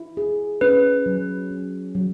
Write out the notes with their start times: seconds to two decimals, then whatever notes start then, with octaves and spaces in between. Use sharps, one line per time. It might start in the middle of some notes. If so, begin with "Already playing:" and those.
Already playing: E4
0.17 G#4
0.61 C#4 B4
1.06 F#3
1.51 C#4
1.95 F#3